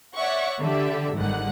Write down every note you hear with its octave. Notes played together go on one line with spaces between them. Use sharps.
C#5 D5 E5 F#5 C#6
D3 G4 A4 D5 E5
G1 G#2 D3 D#3 G3 F#5